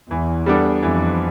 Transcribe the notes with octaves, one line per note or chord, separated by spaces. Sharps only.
E2 E3
G3 B3 D4 A4
F2 E3